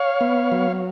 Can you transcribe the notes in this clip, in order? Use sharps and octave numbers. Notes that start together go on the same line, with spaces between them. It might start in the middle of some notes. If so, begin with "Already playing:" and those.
Already playing: C#5 F5
B3
F#3